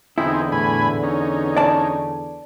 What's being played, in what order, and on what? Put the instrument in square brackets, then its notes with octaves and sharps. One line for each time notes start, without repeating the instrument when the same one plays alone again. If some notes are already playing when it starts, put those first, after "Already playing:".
[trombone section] E2 D3 [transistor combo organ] C4 D#4 G#4 [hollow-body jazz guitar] E4
[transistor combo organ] A2 G#5 B5
C#4 D#4
[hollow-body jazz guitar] D5 A5